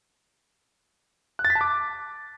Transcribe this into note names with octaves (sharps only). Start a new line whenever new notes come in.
F#6
A6
B6
A5
D6